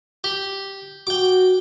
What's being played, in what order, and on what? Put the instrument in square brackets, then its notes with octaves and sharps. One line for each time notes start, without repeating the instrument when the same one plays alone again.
[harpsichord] G4
[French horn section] F#4 [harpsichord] G5 D6